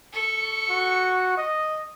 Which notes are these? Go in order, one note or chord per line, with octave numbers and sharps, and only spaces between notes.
A4 C#6
F#4
D#5